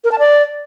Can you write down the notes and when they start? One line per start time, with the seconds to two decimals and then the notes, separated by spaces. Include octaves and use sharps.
0.04 A#4
0.12 A5
0.19 D5